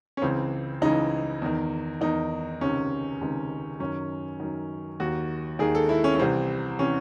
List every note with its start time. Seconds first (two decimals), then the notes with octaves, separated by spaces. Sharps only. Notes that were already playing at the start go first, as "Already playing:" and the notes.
0.17 C#4
0.22 C#2 C#3 E3 C4
0.81 C#2 C#3 E3 D#4
1.42 E2 D#3
2.01 E2 D#3 D#4
2.61 C#2 C3 D#3 C#4
3.21 C#2 C3 D#3
3.80 F#2 D#3 C#4
4.40 F#2 D#3
5.00 D#2 D#3 F#4
5.59 D#2 D#3 G#4
5.75 A4
5.89 E4
6.04 C#4
6.15 C#4
6.18 C2 C3 E3 C4
6.79 C3 E3 C#4